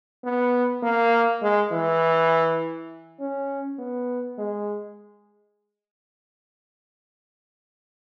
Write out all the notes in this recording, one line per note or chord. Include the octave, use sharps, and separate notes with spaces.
B3
A#3
G#3
E3
C#4
B3
G#3